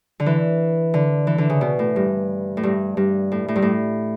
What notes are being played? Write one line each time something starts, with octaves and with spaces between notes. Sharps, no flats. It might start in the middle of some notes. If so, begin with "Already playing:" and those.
D3
E3
D3
E3
D3
C#3
B2
A2
G2
A2
G2
G2
A2
A2
G2
A2